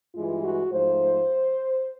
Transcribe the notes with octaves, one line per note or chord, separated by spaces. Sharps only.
G2 E3 G#3 F4
F#4
G#2 F3 A3 C5